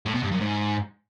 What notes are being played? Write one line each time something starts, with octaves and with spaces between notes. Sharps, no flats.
A2
B2
G2
F#2
G#2